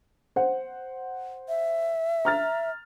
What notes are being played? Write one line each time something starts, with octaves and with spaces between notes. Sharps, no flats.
C5 F#5
E5
A#5 F6 A6